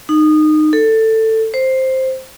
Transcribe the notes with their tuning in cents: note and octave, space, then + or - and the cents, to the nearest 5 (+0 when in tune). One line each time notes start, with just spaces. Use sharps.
D#4 -20
A4 +15
C5 +5